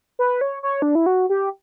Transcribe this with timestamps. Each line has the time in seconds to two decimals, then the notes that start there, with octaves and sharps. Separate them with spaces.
0.19 B4
0.41 C#5
0.63 C#5
0.82 D4
0.95 E4
1.06 F#4
1.29 G4